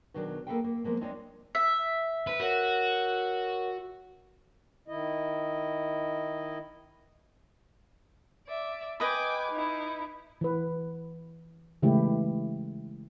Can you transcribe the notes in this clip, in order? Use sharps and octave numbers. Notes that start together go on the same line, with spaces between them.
B2 D#3 F#3 D4 G#4
A#3 G#4 A4 B4 F5 G5
A#3
F3 G#3 A#3 B3
G#3 C4 D4 F4 C#5 D#5
E5
B4
F#4 A#4 C#5 F#5
D#3 E4 D#5
D5 E5
B4 D#5 G5 G#5 B5 D6
D#4 E4
E3 B4
C#3 E3 G#3 A3 E4 G4